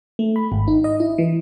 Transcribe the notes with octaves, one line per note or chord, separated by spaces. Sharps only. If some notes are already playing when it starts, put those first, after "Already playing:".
A3
B5
G#1
D#4
D#5
E4
E3